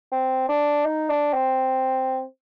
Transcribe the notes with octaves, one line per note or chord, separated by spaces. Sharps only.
C4
D4
D#4
D4
C4